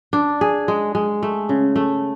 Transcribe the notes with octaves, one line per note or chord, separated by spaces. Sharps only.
D4
G#4
G#3
G#3
A3
C#3
A3